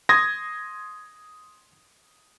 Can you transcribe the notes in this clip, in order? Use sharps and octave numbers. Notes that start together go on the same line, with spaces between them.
C6 D#6 G#6 A#6